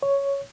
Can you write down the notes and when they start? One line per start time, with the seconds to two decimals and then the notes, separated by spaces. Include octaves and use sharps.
0.03 C#5